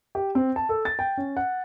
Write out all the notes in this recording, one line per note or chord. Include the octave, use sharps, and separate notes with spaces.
G4
C4
A5
A4
A6
G5
C#4
F#5